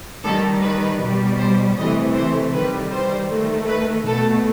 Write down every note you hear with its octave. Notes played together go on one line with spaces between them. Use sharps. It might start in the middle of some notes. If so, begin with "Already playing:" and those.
D#3 G3 A4
B4
B2 G3
C5
C3 E3 A3 D#5
C5
D#3 G3 B4
C5
D#3 A3
B4
B2 A3 A4